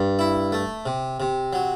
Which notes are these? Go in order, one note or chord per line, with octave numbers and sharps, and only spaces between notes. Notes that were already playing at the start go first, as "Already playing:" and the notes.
Already playing: G2
E4
A3
C3
C3
F#3